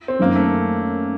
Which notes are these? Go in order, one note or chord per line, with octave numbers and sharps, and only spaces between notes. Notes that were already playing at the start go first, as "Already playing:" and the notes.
C4
F#2 D#3 F#3 A#3
A3